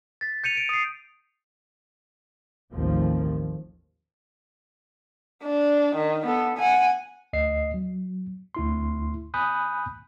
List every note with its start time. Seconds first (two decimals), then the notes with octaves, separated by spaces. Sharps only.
0.21 A6 B6
0.44 G6 C#7 D#7 F7
0.55 C#7 D7
0.69 D#6 C7
2.73 A1 D#2 D#3 F3 C4
5.43 D4
5.96 D#3
6.26 B3 A4
6.59 F#5 G#5
7.33 D2 D#5 C7
7.74 F#3
8.55 D2 E4 C6
9.34 G#5 B5 D#6 F#6 G6